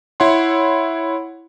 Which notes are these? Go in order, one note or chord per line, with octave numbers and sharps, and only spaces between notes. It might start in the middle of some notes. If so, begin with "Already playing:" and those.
E4 C#5 F#5 C6